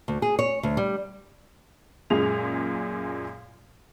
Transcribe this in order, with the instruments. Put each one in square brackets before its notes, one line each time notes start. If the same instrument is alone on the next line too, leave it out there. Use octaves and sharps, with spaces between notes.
[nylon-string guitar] D2
G#4
C#5
D2
G3
[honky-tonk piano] F#2 A#2 G#3 G#4 F7